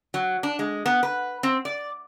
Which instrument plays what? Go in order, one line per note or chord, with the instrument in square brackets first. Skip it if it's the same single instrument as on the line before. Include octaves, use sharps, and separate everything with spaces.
[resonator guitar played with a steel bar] F#3
D4
G#3
B3
B4
C4
D5